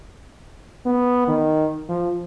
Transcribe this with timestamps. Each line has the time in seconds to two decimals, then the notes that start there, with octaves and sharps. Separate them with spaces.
0.86 B3
1.28 D#3
1.89 F3